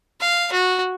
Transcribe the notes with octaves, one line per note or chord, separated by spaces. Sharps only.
F5
F#4